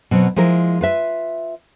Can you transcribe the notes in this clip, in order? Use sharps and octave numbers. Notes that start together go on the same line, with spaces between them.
B2 F#3 C4
F3 G#3 E4 A#4
F4 B4 E5